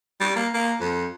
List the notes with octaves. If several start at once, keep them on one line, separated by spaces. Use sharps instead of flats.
G3
A#3
A#3
F2